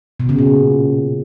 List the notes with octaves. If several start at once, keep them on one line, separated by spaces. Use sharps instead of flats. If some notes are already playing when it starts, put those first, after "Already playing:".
B2
C#3
A#2